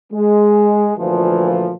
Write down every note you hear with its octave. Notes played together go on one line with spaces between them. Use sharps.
G#3
D2 A#2 E3 F3